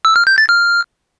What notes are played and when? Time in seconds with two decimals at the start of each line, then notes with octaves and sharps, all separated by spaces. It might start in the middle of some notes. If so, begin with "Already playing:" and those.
0.05 E6
0.16 F6
0.27 G6
0.38 A6
0.49 F6